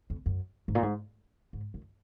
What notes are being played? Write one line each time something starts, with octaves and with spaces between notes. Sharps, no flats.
F2
F#2
G#2
A#2
G#2
G#2
F#2